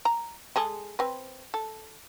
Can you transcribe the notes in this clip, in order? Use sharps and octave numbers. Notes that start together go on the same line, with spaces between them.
A#5
G#3 G#4 A4
C4 B4
A4